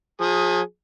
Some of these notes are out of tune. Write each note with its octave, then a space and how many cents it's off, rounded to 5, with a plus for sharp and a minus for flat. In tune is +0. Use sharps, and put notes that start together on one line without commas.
F3 +40 G#4 +0